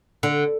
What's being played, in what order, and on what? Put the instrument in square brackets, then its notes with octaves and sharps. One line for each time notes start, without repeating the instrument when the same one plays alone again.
[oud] D3